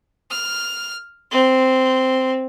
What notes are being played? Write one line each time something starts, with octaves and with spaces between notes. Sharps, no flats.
F6
C4